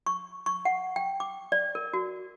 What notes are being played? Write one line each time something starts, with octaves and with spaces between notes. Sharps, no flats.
C#6
C#6
F#5
G5
D6
D5
A#4
F#4